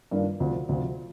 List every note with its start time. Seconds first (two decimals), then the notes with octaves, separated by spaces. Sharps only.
0.11 G2 D#3 A#3 D4 F4
0.40 D2 C3 F3
0.69 D2 C3 F3